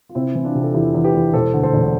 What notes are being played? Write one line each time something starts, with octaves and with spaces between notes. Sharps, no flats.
F4
C3 C4 E4
E3
D4 F4
C3
A4
E2 E4 G4
E2
G4 B4
E2
E1 A4 C5
D2
A4 C5
E1